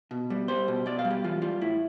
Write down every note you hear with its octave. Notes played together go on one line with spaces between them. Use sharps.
B2
G3
G3 C5
B2
B2 D5
F5
G3
G4
E3 F4
G3 F4
A2 E4